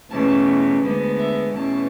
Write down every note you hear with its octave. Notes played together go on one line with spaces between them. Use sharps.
E2 B2 A3 C#4 A5
D2 D3 G#3 B3
E5
E2 B2 A3 C#4 A5